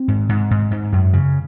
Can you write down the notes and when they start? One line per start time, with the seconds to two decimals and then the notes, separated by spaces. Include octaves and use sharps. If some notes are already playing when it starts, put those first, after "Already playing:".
Already playing: C4
0.08 G#2
0.29 G#2
0.51 G#2
0.71 G#2
0.92 F#2
1.13 C#3